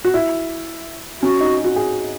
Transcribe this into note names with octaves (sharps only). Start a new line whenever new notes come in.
F#4
E4
C#4 F#4
D#4
F#4
G#4